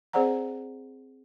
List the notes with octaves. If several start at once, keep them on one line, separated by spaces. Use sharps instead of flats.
C4 G#4 C5 D5 F#5 A#5